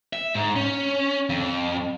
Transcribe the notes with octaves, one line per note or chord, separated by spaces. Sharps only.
E5
G#2
C#4
F2